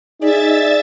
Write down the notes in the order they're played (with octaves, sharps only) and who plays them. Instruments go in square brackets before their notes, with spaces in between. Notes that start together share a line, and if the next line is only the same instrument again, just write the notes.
[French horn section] D#4 [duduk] G#4 [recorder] D5 [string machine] E5 A6